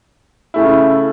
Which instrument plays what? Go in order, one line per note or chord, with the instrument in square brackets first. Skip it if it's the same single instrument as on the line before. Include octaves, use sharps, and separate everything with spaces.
[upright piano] C#3 A3 E4